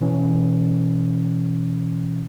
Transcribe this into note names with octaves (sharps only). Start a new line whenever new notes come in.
B2 E3 C#4